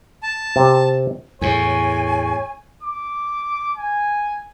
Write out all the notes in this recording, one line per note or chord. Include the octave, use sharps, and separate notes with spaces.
A5
C3
E2 A2 C#5 G#5
D6
G#5